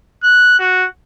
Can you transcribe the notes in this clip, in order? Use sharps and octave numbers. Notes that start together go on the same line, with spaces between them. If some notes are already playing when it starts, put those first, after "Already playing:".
F#6
F#4